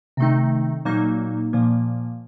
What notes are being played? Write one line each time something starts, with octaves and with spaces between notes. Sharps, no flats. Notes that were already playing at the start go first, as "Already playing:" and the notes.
C3 D#3 A3 D#4
A#2 F#3 A#3 D#4
A#2 F3 A#3